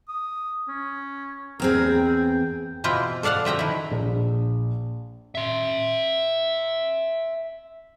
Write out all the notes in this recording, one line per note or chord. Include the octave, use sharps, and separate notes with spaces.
D#6
C#4
E2 C4 G#4 A#4
G5
B2 E3 E4 F4 C5 G5
A4 D5 F5 F#5 A5
F3 E5 G5 A#5
D#3 E4
A#1
E5 C6